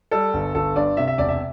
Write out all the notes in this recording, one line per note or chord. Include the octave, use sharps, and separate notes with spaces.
G3 A4
G1
G1 A4
G2 D5
C3 E5
E5
E1 D5
E5